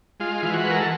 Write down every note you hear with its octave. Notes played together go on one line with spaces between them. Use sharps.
G#3 F4
E3 F4
F#4
G#3 B4
A#4
A4